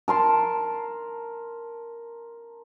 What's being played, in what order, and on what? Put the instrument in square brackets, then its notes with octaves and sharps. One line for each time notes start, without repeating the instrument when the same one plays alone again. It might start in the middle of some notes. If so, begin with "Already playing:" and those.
[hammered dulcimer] A#4 A5 C6